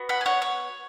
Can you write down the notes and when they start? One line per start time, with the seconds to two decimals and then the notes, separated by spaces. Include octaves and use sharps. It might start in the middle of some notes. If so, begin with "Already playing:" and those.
Already playing: B3 F#4
0.09 F#5 B5
0.21 G#5
0.26 C#5 F#5
0.42 C#5